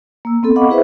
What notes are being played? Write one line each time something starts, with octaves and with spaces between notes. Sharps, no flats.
A#3 E6
B3 C4 A4
D#5 F5 F#5 B5 C#6 D6
E4 G#4 B4 C5 E5